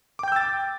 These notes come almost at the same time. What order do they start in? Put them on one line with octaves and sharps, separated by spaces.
D6 G5 G6 E6 A6